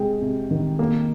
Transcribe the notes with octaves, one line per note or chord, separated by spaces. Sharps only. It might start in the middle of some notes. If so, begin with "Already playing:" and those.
Already playing: C3 G#3 G5
C3
D#3
A#3